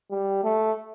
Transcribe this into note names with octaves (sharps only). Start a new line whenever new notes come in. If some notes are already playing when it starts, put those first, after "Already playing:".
G3
A3